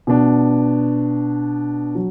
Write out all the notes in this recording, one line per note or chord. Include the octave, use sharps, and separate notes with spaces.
B2 B3 D4
F#3